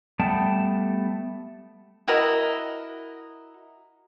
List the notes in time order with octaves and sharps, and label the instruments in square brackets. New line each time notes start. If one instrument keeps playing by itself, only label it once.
[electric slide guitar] G3 A3 B3 G5 A5
[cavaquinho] E4 F#4 A#4 D#5